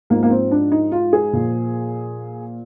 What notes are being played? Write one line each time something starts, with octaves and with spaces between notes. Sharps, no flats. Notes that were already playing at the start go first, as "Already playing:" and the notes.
G#2 F3 A#3
A#3
C4
D4
D#4
F4
G#4
A#2 F3